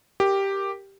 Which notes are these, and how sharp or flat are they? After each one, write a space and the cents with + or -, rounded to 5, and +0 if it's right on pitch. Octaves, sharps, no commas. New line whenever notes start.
G4 +0 A#4 +0